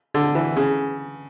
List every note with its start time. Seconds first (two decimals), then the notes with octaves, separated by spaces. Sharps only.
0.14 D3
0.35 E3
0.56 C#3